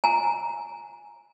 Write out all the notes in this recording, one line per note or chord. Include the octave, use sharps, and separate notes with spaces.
G#5 A#5